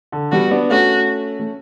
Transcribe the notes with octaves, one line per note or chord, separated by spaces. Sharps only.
D3
G3 B3 F#4
B3 D4
A3 C#4 F#4
A3